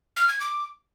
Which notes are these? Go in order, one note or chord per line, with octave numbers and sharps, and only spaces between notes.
F6
G#6
D6